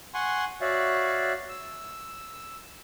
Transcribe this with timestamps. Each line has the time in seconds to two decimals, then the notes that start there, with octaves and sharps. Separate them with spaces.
0.14 F#5 G#5 C6 C#6
0.61 F#4 C#5 D5 E5 F5
1.49 E6